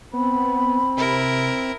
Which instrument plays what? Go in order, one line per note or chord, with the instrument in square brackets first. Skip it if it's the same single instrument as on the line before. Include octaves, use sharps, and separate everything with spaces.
[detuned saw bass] B3 [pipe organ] C4 [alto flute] B5
[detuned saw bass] C3 [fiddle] E4 A#4